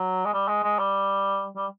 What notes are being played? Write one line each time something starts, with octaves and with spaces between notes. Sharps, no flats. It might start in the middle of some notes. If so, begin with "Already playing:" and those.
Already playing: F#3
G#3
G3
G#3
G#3
G3
G3